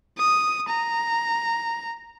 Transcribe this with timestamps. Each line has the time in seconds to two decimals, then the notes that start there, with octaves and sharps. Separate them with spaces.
0.18 D#6
0.68 A#5